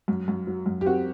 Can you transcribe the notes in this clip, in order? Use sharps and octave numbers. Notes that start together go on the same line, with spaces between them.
F#2
F#2
F#3
F#2
G4
C4 F#4